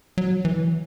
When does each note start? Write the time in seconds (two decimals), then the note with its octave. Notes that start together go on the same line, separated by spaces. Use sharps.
0.18 F#3
0.45 E3